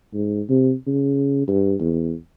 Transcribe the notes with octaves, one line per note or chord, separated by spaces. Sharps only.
G#2
C3
C#3
G2
E2